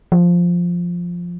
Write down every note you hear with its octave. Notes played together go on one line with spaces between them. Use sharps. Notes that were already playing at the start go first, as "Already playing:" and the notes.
F3